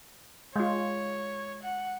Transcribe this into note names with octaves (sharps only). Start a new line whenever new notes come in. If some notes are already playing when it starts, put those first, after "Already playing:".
G#3 F4 C#5
F#5